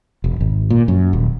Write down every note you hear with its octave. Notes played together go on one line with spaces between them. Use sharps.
E1
G#1
A#2
F#2
D#1